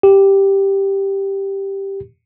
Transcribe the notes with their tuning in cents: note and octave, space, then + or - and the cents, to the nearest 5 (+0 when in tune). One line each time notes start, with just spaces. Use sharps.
G4 +0